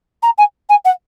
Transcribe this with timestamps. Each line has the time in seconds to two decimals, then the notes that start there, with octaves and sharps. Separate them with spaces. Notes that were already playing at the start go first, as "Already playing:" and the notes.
0.22 A#5
0.38 G#5
0.69 G#5
0.85 F#5